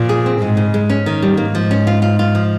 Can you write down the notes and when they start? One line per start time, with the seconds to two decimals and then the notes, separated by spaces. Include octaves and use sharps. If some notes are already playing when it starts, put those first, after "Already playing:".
Already playing: A#2 F3
0.09 G#4
0.26 C4
0.41 G#2 G#3
0.57 C#3
0.74 G#3
0.89 C#4
1.06 D#3
1.22 G3
1.37 G#2 A#3
1.55 F3
1.71 C#4
1.87 F4
2.02 F4
2.19 F4
2.35 F3